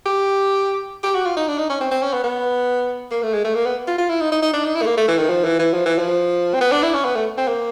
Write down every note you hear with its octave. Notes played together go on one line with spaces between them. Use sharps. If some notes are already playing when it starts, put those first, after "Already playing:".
G4
G4
F#4
F4
D#4
D4
D#4
C#4
C4
C4
C#4
B3
B3
A#3
A3
G#3
A3
A#3
B3
F4
F4
E4
D#4
D#4
D#4
D4
D#4
E4
A3
A#3
A3
E3
D#3
F3
E3
E3
F3
E3
F3
C4
B3
D4
E4
C#4
B3
A3
C4
A#3